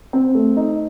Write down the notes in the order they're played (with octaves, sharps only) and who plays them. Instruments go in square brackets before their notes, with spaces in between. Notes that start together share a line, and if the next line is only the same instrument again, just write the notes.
[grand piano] C4
A3
D#4